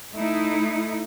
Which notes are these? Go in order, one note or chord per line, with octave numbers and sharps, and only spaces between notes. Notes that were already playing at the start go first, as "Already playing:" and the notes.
A3 D#4 E4